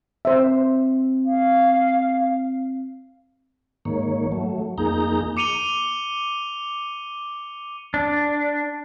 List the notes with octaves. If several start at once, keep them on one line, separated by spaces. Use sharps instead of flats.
C4 C5 E5
F5
G#2 D#3 A#3 C#5
F#3 A3
F2 A#3 D#4 G#4 A#5 G6
D6 C#7 D#7 F7 G7
D4